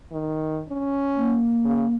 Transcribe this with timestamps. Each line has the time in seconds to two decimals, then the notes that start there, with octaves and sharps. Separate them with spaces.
0.11 D#3
0.69 C#4
1.16 A#3
1.65 C#3